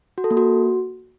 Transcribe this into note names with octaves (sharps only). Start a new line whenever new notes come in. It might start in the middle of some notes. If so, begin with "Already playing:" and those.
F#4
A4
A#3
F#4